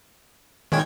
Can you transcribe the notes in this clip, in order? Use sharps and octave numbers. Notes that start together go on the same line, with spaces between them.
A#2 D#3 G#3 C#4 G5 G#6